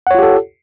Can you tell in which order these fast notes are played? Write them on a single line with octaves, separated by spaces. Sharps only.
F#5 C#5 F4 G4 A4